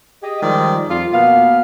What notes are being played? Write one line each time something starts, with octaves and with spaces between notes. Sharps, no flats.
G4 G#4 D#5
D#3 F3 G3 G#3 D5
F2 F4
B2 A#3 B3 F5